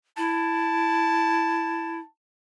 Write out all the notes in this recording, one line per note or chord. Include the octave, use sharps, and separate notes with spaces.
E4 A5